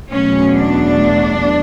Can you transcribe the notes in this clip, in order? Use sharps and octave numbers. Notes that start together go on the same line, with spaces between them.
E2 B2 F#3 A3 C#4
D4